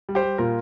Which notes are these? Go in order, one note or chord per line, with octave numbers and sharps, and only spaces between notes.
G3
G4 C5
G3
A#2 F4 A#4